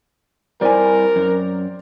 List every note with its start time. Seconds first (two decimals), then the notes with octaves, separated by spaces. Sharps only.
0.61 G3 C4 E4 A#4 D5 G#5
1.16 F#2